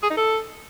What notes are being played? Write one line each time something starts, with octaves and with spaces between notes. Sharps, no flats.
G#4
D#4
A4